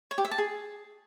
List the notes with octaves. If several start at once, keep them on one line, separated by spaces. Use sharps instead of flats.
C#5
G4
E5
A5
G#4